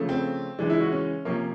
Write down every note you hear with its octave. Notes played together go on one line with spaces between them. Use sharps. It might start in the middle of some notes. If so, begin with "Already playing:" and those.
Already playing: C#3 F3 A3
C4
C#3 E3 G#3 D4
E4
F#4
C#4
C3 F3 A#3 C#4